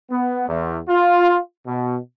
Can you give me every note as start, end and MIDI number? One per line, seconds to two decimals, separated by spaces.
0.11 0.46 59
0.48 0.79 40
0.89 1.38 65
1.67 1.97 47